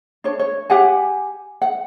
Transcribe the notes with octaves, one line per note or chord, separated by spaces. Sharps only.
D4 C#5
C#5
G4 F#5 G#5
F#5